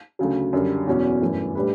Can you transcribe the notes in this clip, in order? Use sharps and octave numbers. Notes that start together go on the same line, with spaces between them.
D2 C#3 F#3
F#2 D3 G3 D4
E2 B2 F#3 C#4
G1 F#2 E3 A3
A2 G3 D4 G4 B4